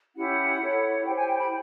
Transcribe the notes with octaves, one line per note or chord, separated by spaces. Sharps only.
C#4 E4 G4 F#5
E4 A4 C#5
E4 G4 C5 G5
G#5
G5
B5